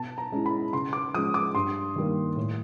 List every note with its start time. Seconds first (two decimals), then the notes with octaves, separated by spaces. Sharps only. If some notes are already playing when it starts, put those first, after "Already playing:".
Already playing: B2 A5
0.18 A#5
0.32 G#3 C#4 E4
0.46 B5
0.73 C#3 C6
0.93 D6
1.14 F3 G#3 C#4 D#6
1.34 D6
1.55 G2 C6
1.96 D#3 G3 A#3
2.36 A2